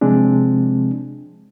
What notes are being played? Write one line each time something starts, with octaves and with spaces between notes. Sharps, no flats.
C3 F3 G#3 C4 D4